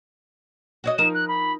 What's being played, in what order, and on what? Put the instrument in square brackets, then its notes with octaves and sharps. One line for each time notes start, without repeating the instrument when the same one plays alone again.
[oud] F#4 C#5 D#5
[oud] F3 D#4 A#4 [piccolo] E7
[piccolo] F#6
B5